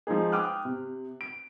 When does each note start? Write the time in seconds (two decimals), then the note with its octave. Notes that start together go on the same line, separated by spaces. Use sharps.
0.07 F3 G#3 D#4 G#4
0.32 G5 D6 D#6 F6 F#6
0.65 C3
1.21 D7